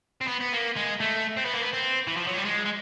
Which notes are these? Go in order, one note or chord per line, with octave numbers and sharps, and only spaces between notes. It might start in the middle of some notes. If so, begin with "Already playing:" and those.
C4
B3
B3
A#3
G#3
A3
C4
B3
A#3
B3
C4
E3
F3
F#3
G3
G#3
G#3